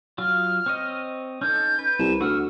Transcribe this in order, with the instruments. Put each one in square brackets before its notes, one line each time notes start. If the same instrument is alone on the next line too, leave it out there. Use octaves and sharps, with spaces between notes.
[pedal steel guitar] F#3 F4 [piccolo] F6
[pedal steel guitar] C4 C#5 D#5
[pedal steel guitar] C#4 D#4 A4 [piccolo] G6
[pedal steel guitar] B4
[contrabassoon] C2 [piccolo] E7
[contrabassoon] D2 [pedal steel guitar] F#4 F#5 F6 [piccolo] E6